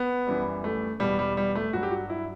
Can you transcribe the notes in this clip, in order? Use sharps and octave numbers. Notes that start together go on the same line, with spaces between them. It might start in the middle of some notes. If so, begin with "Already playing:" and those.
Already playing: B3
F#2 E3 G3
A3
E2 B2 G3
G3
G3
A3
G2 F#3 F#4
G4
F#4
E4